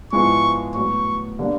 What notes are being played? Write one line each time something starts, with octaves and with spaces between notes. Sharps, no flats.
G#2 F3 G#3 B3 E4 C#6
A2 F#3 B3 C#6
D3 G3 A#3 D4